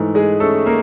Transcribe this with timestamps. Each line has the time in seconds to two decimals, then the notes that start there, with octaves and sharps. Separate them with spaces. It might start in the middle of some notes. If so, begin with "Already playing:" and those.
Already playing: G#2 E3 A3
0.15 G#3 G#4
0.40 A3 C#4 A4
0.66 A#3 A#4